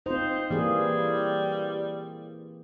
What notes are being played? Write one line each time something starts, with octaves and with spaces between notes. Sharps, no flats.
C4 D#4 F4 C5
E3 G3 A#3 G#4